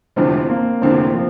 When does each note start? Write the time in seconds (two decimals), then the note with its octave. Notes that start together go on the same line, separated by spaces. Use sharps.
0.16 F1 E2 D3 F3 C4
0.49 A#3
0.82 F1 E2 D3 F3 C4
1.15 F3